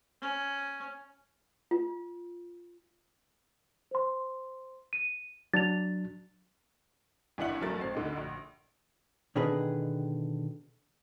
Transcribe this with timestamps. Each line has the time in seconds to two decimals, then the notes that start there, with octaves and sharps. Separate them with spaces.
0.22 C#4
1.71 F4
3.91 C5 C6
4.93 D#7
5.54 F#3 D4 A6 F7
7.38 G#1 E3 D4 E4 F#5 F#7
7.61 G1 F#3 A3 A#4 A6
7.79 A1 C4 C7
7.95 D2 D3 D#4
8.17 A#1
9.36 B2 D3 D#3 D4 G#4 B4